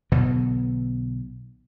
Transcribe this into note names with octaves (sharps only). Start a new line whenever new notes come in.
B1 B2 D3 B3